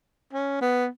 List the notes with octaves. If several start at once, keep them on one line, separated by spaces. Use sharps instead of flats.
C#4
B3